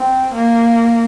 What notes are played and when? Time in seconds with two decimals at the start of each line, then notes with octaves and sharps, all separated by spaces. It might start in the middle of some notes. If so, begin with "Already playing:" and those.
Already playing: C4
0.35 A#3